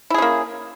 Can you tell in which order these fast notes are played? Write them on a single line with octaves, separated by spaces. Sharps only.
E4 G#4 C#4 A#3